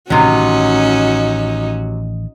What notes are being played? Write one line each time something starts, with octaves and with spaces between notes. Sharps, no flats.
A1 A2 C3 D#3 F#3 C#4 D#4 F#4